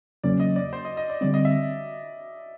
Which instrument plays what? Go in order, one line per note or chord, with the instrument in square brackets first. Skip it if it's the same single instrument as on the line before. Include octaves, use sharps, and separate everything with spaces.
[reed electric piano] E2 C#3 F#3 A#3 C#4 [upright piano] D5
[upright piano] D#5
D5
C5
D#5
D#5
D5
[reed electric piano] D3 G3 C4 [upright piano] D5
[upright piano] D#5
E5